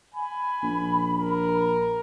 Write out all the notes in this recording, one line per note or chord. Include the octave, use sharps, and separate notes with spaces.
G#5 B5
A#1
A#4